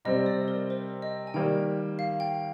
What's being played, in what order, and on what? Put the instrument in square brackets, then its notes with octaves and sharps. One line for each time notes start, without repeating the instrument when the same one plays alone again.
[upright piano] C3 G3 C4 [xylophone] D#5
[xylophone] D5
A#4
C5
D#5
G#5
[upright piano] D#3 G3 A#3 [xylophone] G5
[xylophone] F5
G5